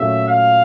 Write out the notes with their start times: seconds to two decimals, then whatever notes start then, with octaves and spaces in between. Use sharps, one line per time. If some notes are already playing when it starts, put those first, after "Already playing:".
Already playing: A#2 F#3 A3 C#4 E5
0.28 F5